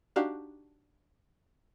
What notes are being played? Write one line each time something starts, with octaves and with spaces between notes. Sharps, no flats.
D4 D#4 F#4 G4 F5